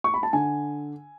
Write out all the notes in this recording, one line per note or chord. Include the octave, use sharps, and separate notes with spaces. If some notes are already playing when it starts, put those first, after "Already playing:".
C#6
B5
A5
D3 G#5